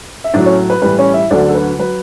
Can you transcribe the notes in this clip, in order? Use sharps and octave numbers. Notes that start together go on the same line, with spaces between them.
E5
A2 F#3 D4 D5
C#4 C#5
B4
A2 E3 G3 B4
C#4 C#5
E4 E5
D2 D3 F#3 D4 D5
A4
B4
F#3 B4